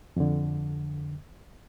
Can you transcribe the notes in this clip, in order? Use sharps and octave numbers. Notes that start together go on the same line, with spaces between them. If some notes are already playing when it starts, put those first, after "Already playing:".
F2 D3